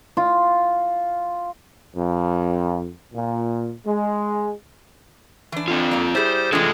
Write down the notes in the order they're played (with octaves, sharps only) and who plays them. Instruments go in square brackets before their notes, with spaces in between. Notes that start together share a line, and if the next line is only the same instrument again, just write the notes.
[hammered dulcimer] F4
[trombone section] F2
A#2
G#3
[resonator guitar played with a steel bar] E3 D4
[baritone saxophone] D3 [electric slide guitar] C4 F4
[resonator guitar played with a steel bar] A#3 D5
[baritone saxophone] G3 [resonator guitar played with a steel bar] E4 G#4 [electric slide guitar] C5
[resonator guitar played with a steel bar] E3 D4 [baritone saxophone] G#3 [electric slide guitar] A3 F4 A4